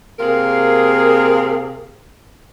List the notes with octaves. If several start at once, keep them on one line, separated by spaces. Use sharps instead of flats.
C3 A#3 F4 G#4 A#4